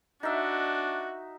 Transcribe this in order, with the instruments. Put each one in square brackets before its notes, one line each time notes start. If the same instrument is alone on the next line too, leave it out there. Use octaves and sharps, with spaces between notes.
[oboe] D4 [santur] D#4 E5 [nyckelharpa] F#4